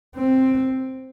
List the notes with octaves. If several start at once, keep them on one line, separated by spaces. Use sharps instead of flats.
C4